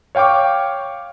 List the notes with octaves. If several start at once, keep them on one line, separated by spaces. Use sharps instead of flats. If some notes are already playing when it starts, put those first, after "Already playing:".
C#5 F5 G5 C#6 D6